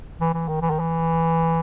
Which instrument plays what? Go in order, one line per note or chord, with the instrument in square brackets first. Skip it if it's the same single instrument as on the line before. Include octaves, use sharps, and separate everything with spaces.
[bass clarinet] E3
E3
D#3
E3
D#3
E3